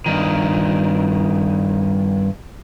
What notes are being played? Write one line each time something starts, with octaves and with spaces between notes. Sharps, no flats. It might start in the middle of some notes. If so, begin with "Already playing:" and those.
G2 D#3